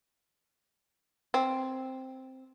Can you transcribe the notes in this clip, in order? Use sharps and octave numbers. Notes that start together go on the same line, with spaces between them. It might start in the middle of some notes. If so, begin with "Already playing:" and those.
C4